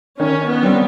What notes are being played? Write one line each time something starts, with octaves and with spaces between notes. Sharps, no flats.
D#3 C#4
B3
G3 C4